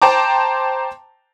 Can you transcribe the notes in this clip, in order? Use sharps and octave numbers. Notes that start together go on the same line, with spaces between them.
C5 G5 A5 A#5 D6